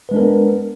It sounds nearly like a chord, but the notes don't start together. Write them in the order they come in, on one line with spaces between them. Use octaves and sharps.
B4 G#3 D4 A#4 B3